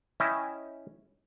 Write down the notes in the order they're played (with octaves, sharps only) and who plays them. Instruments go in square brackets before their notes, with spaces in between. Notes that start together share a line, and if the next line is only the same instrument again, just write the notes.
[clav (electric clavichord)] C#4 E4 D#5 E5 G5